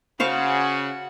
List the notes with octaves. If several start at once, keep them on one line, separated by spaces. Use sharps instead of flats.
C#3 F#4 C5 F5 F#5 C#6